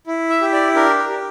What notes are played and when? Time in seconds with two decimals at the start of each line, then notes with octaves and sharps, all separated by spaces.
0.07 E4
0.29 E5
0.41 G4
0.52 D5
0.75 D4 A#4
0.99 A#4
1.09 G4